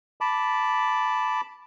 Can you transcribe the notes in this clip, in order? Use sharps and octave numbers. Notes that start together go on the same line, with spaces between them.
A5 B5 D6